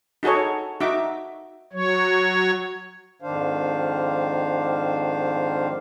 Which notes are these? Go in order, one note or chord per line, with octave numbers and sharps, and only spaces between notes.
D#4 F#4 G#4 A4 C#5
D#4 F#4 E5 D6
F#3 C#5
F2 G#2 D#3 D4 C5 F5